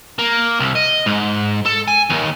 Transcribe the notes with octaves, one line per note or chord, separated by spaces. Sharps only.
A#3
C2
D#5
G#2
A4
G#5
D#2